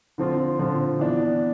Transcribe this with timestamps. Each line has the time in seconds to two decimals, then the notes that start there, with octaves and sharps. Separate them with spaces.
0.18 D3 F3 C4 F4
0.58 D3 F3 C4 F4
1.00 E3 B3 D4